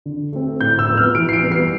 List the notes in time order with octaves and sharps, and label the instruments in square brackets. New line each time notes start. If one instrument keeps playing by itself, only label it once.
[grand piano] D3
A3 C4
A2 G6
E6
F3 B3
F6
E3 D7
C7
D7
G3 B3
C7